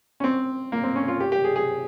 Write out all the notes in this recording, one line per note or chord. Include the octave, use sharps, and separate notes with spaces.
C#4
C4
A#3
C4
C#4
F4
G4
G4
G#4
G#4